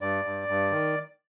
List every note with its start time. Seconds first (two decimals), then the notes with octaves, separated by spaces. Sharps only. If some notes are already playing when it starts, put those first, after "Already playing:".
0.01 G2 D5
0.25 G2
0.48 G2
0.71 D#3